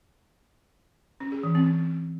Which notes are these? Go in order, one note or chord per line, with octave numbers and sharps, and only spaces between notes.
C#4
G#4
E3
C4
C4